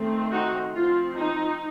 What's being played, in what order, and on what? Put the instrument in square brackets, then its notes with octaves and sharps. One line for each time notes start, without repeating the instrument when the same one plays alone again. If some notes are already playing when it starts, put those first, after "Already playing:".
Already playing: [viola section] D#3 A3 C4
D#4 F#4
F3 C4 F4
D#4